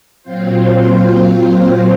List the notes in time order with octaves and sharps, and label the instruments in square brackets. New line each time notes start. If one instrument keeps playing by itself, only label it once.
[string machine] A#2 F#3 C4 F4 C5